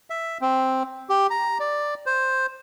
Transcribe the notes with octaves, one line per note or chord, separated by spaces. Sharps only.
E5
C4
G4
A#5
D5
C5